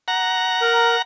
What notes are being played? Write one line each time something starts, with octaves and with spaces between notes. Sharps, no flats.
F#5 A#5
A#4